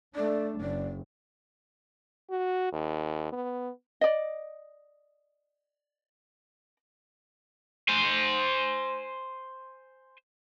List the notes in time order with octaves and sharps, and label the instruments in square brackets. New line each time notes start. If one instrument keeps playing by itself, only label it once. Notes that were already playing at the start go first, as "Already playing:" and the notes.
[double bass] A3 D4 [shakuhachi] D5
[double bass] F#1 [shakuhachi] D5
[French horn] F#4
D#2
B3
[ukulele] D5 D#5
[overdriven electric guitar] C5 G#5